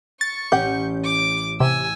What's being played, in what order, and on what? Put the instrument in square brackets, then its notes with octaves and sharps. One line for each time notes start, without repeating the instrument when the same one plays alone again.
[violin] C#6 [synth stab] A6
[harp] A1 C#4 C#5 [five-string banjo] G4 F#5 [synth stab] G6
[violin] D6 D7
[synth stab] C3 [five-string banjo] G4 [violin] G#5 E6